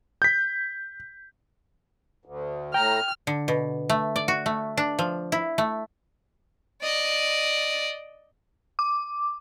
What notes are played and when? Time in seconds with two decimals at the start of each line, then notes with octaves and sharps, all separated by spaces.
0.22 G6 B6
2.25 D2
2.74 A2 G5 A#5 F6
3.27 D3
3.48 B2
3.90 A3
4.16 D5
4.28 F#4
4.46 A3
4.77 D4
4.99 F3
5.32 E4
5.58 A3
6.82 D5 D#5
8.79 D6